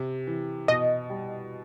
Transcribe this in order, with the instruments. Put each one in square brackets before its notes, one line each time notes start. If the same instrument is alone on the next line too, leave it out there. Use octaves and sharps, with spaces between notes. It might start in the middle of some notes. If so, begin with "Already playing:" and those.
Already playing: [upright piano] C3
E3
[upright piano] B2 [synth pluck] D#5
[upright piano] G3